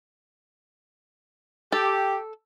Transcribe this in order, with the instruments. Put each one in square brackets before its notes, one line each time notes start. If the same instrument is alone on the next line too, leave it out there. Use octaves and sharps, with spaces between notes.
[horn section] G4 [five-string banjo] A4